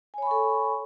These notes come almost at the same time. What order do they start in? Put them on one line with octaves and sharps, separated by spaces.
G#5 C#5 B5 C#6 A4